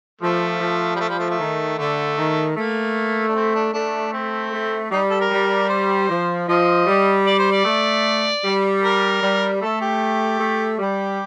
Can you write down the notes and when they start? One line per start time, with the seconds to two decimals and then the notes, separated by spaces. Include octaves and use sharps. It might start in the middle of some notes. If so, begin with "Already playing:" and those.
0.21 F3 A3
0.60 F3
0.96 G3
1.00 A3
1.09 G3
1.19 A3
1.30 A3
1.39 D#3
1.78 D3 A3
2.17 D#3
2.57 A3 A#3
3.28 D4
3.35 C4
3.55 D4
3.73 A3 D4
4.13 C4
4.52 A3
4.91 G3 D#4
5.10 A4
5.21 A#4
5.31 G3
5.69 C5
6.09 F3
6.48 F3 D#5
6.87 G3
7.26 D5
7.39 C5
7.52 D5
7.65 A3
8.44 G3
8.83 A#4
9.22 G3
9.61 A3 A4
9.81 G4
10.39 A3
10.79 G3 G4